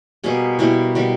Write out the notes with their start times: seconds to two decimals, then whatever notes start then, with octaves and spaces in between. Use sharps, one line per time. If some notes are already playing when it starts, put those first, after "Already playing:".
0.24 B2 G3 A#3 G#4
0.59 B2 G3 A#3 E4
0.95 B2 G3 A#3